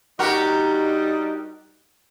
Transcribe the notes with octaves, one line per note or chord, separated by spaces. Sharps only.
G3 D4 D#4 F#4 G4 A#4